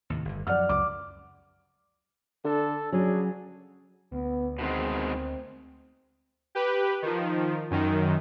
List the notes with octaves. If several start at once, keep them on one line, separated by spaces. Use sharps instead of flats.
D#2 A2 C3
G1 D3
F#2 F3 D5 F#5 F6
C#2 F#2 D6
D3 A4
C#3 F#3 D4 G#4
D2 B3
B2 D#3 G#3 C4
G4 B4
D#3 F3
F#2 D#3